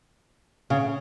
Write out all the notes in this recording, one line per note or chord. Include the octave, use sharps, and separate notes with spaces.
C#3